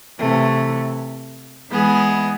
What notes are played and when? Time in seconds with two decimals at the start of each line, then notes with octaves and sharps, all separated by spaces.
0.19 C3 E3 A3
1.70 E3 G#3 B3 E4 G#4